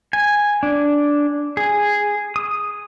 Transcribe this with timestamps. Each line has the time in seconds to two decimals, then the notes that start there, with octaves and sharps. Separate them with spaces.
0.13 G#5
0.63 D4
1.57 G#4
2.36 D#6